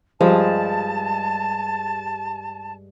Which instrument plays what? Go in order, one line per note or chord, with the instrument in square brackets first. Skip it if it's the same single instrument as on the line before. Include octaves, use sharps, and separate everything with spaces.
[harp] G2 [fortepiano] F3 [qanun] G#3 [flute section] A5